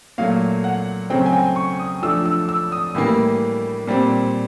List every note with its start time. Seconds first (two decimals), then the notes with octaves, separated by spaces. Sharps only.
0.18 A#2 F#3 A3 F5
0.64 F#5
1.10 C#3 F#3 A3 C4 G5
1.26 G#5
1.33 G5
1.56 C#6
1.79 D#6
2.03 F3 A3 D4 E6
2.26 E6
2.49 E6
2.72 D#6
2.95 A2 E3 G3 A#3
3.87 A#2 G3 C4